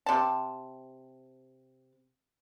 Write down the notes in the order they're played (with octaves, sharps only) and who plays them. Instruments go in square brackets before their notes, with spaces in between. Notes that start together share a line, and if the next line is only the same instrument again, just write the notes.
[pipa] C3 A5